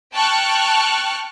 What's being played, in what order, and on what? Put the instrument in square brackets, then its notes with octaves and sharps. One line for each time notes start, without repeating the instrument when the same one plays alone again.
[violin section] G5 A5 C#6 F6 F#6